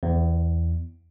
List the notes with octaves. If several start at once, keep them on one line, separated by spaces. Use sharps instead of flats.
E2